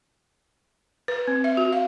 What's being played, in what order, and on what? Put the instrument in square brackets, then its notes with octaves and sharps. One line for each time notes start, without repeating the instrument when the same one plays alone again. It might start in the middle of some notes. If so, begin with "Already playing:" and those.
[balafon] B4
C4
E5
F#4
F5